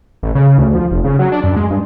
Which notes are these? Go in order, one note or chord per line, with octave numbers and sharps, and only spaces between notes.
A1
C#3
D2
F3
F1
C#3
F#3
D4
F#2
G#3
G2